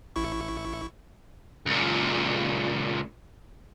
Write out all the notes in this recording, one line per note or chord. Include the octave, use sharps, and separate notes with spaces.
A1 E4 C#6
C#2 A#2